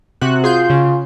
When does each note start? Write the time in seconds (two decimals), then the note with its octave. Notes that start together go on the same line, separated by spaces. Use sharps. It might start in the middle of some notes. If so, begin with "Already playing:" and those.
0.21 C3 F#4 F#6
0.44 F4 G#4 C6 G6
0.70 C#3